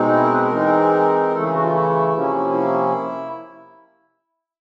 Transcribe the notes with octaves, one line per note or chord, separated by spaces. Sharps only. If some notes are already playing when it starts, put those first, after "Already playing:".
Already playing: B2 G#3 C4 D#4
E4
A#4
B4
A#4
E3 G#3 C4 D#4
C#3 E3 A3 A4
G#4
F#4
F4
E4
C3 F3 A#3 C#4
E4